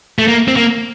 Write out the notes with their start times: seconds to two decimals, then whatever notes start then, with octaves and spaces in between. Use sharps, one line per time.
0.19 A3
0.28 A#3
0.48 C4
0.56 A#3